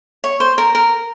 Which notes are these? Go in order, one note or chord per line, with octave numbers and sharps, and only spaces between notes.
C#5
C5
A#4
A#4